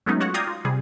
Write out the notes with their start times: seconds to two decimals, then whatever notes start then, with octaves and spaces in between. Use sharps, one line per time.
0.06 F#3 G#3 A3 B3 C#4 D#4
0.20 F4 F#4 C#5 F#5
0.34 D5 F5 G5 A#5 D#6 G#6
0.47 F4
0.65 C3 G3 G#4